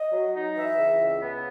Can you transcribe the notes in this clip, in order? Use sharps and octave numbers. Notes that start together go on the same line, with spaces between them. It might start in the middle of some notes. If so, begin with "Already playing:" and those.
Already playing: D#5
F#3
D#4
E3 E5
C#2
C#3
B3